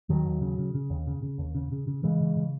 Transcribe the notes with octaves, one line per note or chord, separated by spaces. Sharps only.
D#2 D#3 F#3
D#2
C#3
C#3
C#3
D#2
C#3
C#3
D#2
C#3
C#3
C#3
C#3 E3 G#3
C#3
C#3